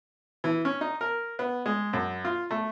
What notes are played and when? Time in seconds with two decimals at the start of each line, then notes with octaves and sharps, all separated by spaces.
0.44 E3
0.65 C#4
0.81 D#4
1.01 A#4
1.39 B3
1.66 G#3
1.93 F#2
2.25 F4
2.51 A3